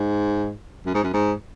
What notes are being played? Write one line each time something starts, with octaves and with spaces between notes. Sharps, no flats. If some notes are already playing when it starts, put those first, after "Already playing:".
Already playing: G#2
F#2
G#2
F#2
G#2